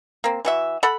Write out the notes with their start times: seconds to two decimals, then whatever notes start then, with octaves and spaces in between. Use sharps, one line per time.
0.24 A#3 C4
0.45 E3 F#4 E5
0.83 A4 F#5 B5